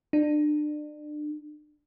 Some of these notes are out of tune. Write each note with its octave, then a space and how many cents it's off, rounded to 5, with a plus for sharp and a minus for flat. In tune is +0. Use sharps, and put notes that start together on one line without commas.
D4 +30